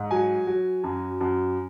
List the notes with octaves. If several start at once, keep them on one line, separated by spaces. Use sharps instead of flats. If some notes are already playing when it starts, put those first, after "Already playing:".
Already playing: G#2
F#3 G#5
F#3
F#2
F#2